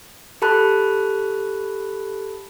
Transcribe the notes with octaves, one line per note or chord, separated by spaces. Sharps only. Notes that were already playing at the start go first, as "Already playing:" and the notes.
G4 A4 A5 B5 F#6